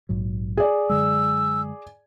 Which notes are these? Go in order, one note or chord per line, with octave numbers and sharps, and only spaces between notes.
A#1 G#2 F#3
G#4 D5
F#2 D3 G#3 E6